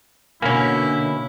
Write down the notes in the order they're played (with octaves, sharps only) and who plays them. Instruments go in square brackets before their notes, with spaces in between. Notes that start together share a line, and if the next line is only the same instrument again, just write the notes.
[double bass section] B2 [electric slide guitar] D3 F#5 G#5 [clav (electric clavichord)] A#3 C#4 [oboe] E4